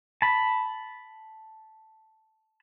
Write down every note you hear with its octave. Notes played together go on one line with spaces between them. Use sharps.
A5 B5